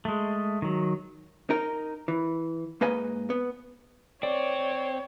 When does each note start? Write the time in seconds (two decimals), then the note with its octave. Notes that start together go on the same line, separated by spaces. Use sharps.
0.05 G#3 A3
0.62 D#3 F#3
1.50 D#4 A#4
2.08 E3
2.81 G#2 A#3 B4 D#5 G#5
3.30 B3
4.23 C4 C#5 D5